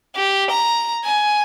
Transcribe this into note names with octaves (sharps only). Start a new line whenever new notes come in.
G4
A#5
G#5